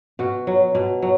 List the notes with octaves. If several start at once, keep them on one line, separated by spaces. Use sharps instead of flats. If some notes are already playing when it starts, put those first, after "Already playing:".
B2 F#4
F#3
B2
F#3